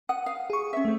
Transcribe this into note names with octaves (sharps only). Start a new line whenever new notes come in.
F#5 D#6
F5
G#4 C#6
C#4 E5
A3 C4